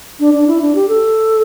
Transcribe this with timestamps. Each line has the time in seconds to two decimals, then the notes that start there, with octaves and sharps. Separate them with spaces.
0.20 D4
0.34 D4
0.47 E4
0.62 D4
0.75 G4
0.89 A4